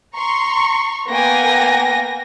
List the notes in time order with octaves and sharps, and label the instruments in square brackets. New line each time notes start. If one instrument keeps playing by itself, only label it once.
[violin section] A#5 C6 C#6
[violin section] A#3 G5 G#5 [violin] B3 A#6